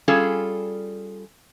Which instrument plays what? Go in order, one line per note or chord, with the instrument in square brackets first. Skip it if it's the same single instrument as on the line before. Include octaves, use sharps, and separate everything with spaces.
[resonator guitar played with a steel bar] G3 C#4 F4 G#4 A4